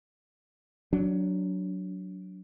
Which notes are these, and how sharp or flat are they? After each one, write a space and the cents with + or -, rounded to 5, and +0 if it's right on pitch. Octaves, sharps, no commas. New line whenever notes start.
F#3 +5 D4 -15